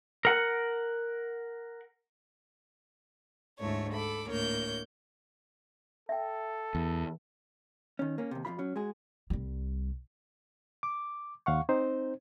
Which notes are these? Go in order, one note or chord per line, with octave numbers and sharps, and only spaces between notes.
A#4 F#5
D2 G#2 A3 E4 C#5
A4 B5 D6
D2 A2 A#3 C#5 G6
A4 E5 G5
E2
D#3 C#4
A#3 C#4
D#2 C3
F2 A#2 F4 B5
F#3 C#4
G#3 F#4 G#4
C2 G3
D6
D#2 F5 F#5 C#6
C4 D#4 C5